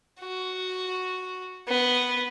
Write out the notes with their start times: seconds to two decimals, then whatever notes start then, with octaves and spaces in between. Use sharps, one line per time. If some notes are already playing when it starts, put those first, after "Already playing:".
0.21 F#4
1.68 B3